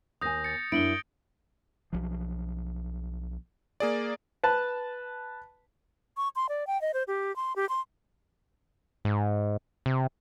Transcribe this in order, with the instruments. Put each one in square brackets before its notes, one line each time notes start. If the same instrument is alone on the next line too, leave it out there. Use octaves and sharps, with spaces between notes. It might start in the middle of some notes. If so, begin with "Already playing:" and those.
[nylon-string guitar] D#2 G#5 [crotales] D#6 G6 A#6
[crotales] A6 C#7
[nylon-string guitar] F#2 D4 E4 [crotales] D7 F#7 G7
[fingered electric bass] B1 F3
[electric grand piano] A#3 G#4 D5
[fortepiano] B4 A5
[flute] C#6
C6
D5
G5
D#5
C5
G4
C6
G4
C6
[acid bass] G#2
C3